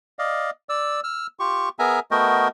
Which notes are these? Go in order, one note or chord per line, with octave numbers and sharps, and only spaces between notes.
D5 D#5 F5
D5 E6
E6 F6
F4 G4 C#6
B3 G#4 A#4 E5 G#5 A#5
A3 B3 F#4 A#4 D#5 G5